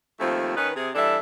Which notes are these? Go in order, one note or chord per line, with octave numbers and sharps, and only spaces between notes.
D#2 F3 A3 C4 F4
D#3 C#4 D#4 B4
C3 G#4
E3 G3 D4 A4 E5